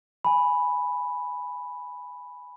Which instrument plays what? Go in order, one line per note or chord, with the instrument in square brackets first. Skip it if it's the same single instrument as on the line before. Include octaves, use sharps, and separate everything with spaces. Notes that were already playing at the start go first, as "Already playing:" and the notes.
[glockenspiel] G#5 B5